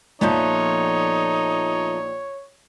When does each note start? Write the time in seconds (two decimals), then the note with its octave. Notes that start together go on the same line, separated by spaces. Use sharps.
0.21 A#1 F3 A3 B3 D#4 C#5